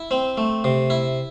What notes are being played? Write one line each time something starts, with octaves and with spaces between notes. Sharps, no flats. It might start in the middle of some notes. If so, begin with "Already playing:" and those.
Already playing: E4
C4
A3
C3
E4